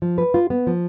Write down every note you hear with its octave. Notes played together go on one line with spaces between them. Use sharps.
F3
B4
F4
B3
F3